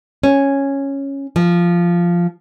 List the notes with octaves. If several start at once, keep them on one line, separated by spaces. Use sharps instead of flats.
C#4
F3